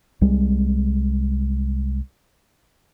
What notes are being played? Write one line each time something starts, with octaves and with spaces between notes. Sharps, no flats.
C2 G3 G#3